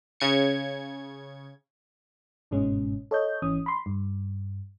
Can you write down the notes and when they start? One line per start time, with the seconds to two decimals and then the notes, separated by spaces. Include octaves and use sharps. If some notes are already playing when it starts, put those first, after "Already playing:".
0.20 C#3 G#6 C#7
2.51 G1 G#2 B2 G#3 C#4
3.11 A4 C#5 D#5 G6
3.42 G#1 E3 C#4 D#6
3.66 B5 C6
3.86 G2